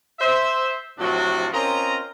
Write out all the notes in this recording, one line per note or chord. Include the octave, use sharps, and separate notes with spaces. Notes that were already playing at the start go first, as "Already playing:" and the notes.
C5 E5
A2 C3 F3 F#3 D4 F#4
C4 C#4 F4 A#4 D#5 A#5